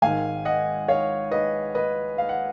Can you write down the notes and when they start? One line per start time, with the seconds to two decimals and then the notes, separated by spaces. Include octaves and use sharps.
0.02 G#1 G#2 D#3 F5 G#5
0.45 D#5 F#5
0.88 C#5 F5
1.31 B4 D#5
1.75 B4 D#5
2.18 F5
2.29 F#5